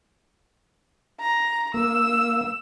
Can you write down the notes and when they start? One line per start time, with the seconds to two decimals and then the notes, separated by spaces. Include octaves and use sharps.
1.20 A#5
1.74 A#3 E6